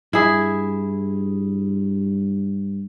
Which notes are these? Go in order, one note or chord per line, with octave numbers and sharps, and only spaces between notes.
G2 E4 G#4